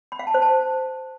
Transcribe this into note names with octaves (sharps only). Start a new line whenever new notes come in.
B5
F5
A5
C5
A5